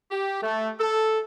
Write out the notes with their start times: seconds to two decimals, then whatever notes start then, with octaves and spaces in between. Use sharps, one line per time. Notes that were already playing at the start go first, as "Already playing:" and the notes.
0.11 G4
0.42 A3
0.79 A4